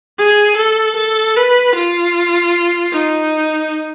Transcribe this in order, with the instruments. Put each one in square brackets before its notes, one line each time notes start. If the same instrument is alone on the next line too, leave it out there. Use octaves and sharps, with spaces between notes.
[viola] G#4
A4
A4
B4
F4
D#4